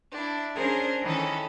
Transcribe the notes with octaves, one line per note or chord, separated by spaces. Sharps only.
D4 E4
C#4 D4 G#4 A#4 C5
D#3 E3 C#4 A4